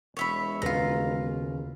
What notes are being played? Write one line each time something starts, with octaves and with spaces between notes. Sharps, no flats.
E1 C#5 E5 B5
D#2 C#3 F4 B4 A#5